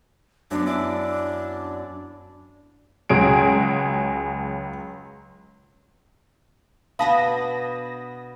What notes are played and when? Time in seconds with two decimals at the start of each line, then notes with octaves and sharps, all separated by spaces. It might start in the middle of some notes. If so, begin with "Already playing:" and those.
0.51 F#2 B3 D4
0.66 D4 E4 D5
3.09 C#2 F#3 G#4 D7
6.99 B2 B3 D4 F5 A5 B5 D#6 A#6